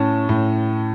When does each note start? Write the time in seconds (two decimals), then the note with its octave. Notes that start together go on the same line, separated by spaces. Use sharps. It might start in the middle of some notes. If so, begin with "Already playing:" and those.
Already playing: A2 C#4 A5
0.29 A2